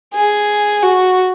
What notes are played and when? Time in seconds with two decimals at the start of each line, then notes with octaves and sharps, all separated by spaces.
0.14 G#4
0.83 F#4